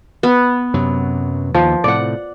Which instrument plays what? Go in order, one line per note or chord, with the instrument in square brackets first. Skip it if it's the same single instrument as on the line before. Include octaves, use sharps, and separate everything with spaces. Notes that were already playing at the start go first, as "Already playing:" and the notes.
[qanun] B3
[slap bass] F#2 C3 F#3
[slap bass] D#2 [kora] F3
[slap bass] A2 C3 [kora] D5 F#5